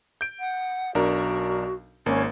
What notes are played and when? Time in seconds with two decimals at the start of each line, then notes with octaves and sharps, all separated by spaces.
0.21 G6 D7
0.40 F#5
0.95 B1 D4 F#4 A#4
2.06 G#1 A#3 C#4